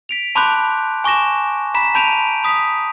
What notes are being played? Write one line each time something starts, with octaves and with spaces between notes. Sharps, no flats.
B6 D7 F7
A5 B5 C6 D6 F#6 G6
G#5 C#6 D6 A#6 E7
A#5 B5 B6 E7
A5 B5 G6 D7 D#7 F7
B5 D#6 B6